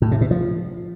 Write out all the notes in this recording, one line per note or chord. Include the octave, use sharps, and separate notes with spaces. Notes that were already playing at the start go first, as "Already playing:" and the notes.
A2
C3
B2
F3